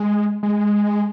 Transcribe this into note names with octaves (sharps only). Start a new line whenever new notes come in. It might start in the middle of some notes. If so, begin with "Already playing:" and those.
Already playing: G#3
G#3